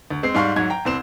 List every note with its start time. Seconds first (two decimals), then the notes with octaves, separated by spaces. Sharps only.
0.10 D2
0.23 G#3 C4 C7
0.34 G#2 G3 F5 C6 C#6
0.56 G#2 F#3 G#6
0.70 G5 A#5
0.85 C2 C4 E7